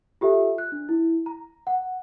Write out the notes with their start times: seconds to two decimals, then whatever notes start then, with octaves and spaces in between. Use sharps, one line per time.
0.21 F4 G4 A4 E5
0.58 F#6
0.72 D4
0.89 E4
1.26 A#5
1.67 F#5